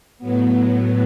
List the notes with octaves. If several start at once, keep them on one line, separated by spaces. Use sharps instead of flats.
A2 F#3 B3